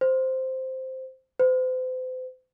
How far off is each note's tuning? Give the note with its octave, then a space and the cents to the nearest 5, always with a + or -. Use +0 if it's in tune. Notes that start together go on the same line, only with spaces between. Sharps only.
C5 -5
C5 -40